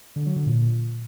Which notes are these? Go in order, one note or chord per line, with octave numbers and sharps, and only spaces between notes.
D3
F#3
D3
A#2